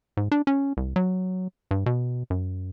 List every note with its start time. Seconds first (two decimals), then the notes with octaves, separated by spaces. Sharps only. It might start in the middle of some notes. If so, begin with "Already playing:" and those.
0.17 G#2
0.32 D4
0.47 C#4
0.77 C2
0.96 F#3
1.71 G2
1.86 B2
2.30 F#2